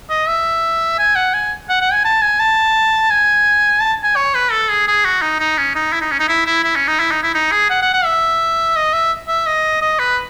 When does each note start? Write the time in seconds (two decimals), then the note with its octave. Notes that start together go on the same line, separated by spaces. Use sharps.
0.10 D#5
0.28 E5
0.99 G#5
1.15 F#5
1.34 G#5
1.69 F#5
1.81 F#5
1.92 G#5
2.04 A5
2.22 G#5
2.39 A5
3.10 G#5
3.80 A5
4.04 G#5
4.16 C#5
4.34 B4
4.51 A4
4.69 G#4
4.87 G#4
5.05 F#4
5.22 D#4
5.39 D#4
5.58 C#4
5.75 D#4
5.92 E4
6.01 D#4
6.11 C#4
6.19 D#4
6.28 E4
6.46 E4
6.64 E4
6.76 C#4
6.87 D#4
6.99 E4
7.10 D#4
7.23 E4
7.34 D#4
7.51 G#4
7.69 F#5
7.82 F#5
7.93 F#5
8.04 E5
8.76 D#5
8.93 E5
9.28 E5
9.46 D#5
9.82 D#5
9.99 B4